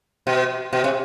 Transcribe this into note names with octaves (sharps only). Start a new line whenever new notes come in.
B2
B2
C3